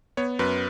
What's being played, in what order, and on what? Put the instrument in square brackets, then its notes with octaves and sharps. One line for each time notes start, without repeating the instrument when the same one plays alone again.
[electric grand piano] B3 C#5
F#2 B4